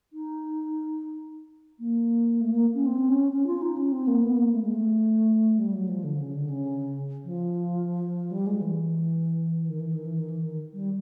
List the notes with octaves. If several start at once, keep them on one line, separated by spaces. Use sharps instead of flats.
D#4
A#3
A3
A#3
C#4
C4
C#4
C#4
F4
D#4
C#4
C4
A#3
B3
A#3
A3
G#3
A3
G3
F#3
F3
D3
C#3
D3
C#3
F3
G3
G#3
E3
D#3
E3
D#3
E3
D#3
E3
D#3
G3